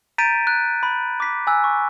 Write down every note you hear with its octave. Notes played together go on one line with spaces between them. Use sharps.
A#5 G6 A6 B6 D7 D#7
F#6
B5
D6 B6
G#5 E6 F#6
C#6